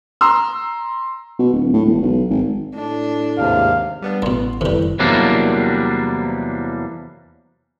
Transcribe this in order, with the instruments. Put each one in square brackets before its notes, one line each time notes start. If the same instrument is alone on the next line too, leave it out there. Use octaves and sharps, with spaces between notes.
[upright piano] A#5 C6 E6
[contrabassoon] B2
D1
A2
E1
B1
G#1
[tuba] A2 [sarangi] D4
[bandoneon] D#2 G#2 C3 [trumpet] F5
[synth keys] G3 B3 D4
[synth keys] A1 [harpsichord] G2 B2 [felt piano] B3 C6
[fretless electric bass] F#1 D#3 [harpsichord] C3 G3 [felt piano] E4 A4 B4
[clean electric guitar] E2 C3 F#3 G3 A#3 D4